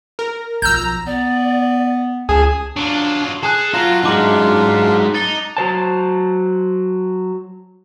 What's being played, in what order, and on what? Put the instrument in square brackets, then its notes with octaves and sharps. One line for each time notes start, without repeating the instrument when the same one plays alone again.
[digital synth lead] A#4
[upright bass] B1 F3 [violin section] A#5 [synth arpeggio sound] E6 G6
[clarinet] B3 [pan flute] D5
[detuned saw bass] C#2 [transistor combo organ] G#4 [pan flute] A5
[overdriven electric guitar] F#3 F4 [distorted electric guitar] D4
[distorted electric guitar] G#4 [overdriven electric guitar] A4 [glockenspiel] A5 D#6 F#6
[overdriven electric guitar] F#2 [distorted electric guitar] F4 [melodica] A#5
[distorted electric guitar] G#3 D#4 [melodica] D4 F4 [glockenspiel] A#5 D6 F#7
[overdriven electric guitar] D#4 [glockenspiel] A6 G7
[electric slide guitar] F#3 C5 A5